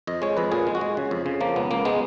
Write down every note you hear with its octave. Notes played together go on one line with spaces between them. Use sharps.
F2 D#5
G#3 C#5
F2 B4
A#2 G#4
G#3
F#4
G#3
C#3
F2
C#3
F3 A#3
C#2 B3
C#2 A#3
G#3 B3